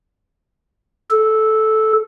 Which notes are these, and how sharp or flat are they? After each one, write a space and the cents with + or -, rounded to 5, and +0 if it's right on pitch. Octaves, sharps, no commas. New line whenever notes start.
A4 -10